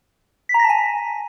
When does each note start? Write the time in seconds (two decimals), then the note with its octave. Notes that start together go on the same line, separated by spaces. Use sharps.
0.49 B6
0.54 A#5
0.59 A#6
0.64 A5
0.70 G#5